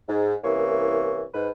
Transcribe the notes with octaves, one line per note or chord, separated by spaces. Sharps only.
G#2
C2 E3 A#3 C#4 C#6
G#2 B4